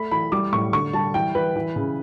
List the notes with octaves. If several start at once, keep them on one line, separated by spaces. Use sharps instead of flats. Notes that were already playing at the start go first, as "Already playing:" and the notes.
Already playing: A3 B5
E3 B5
G3 D6
A2 C#6
D3 C#6
G3 A5
E3 G5
E3 B4
E3
C#3